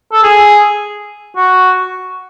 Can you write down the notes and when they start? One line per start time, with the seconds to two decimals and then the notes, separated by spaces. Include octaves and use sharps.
0.12 A4
0.23 G#4
1.37 F#4